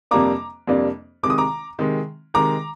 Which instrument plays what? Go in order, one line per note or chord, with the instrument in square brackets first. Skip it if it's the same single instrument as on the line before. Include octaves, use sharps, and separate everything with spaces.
[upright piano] F2 C3 G3 A#3 D4 A#5 D6
F2 C3 G3 A#3 D4
C3 D#3 G#3 D6
D#6
A#5 D6
C3 D#3 G#3
C3 D#3 G#3 A#5 D6